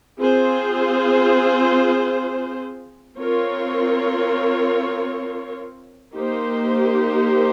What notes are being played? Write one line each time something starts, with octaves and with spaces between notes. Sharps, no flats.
C4 F4 G#4 C5
C4 F4 A#4 C#5
A#3 D#4 G4 C5